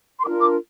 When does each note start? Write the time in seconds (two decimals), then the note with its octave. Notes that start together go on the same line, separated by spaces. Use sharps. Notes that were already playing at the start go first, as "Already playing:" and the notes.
0.19 C6
0.24 D4 F4 A#4 D6
0.39 D6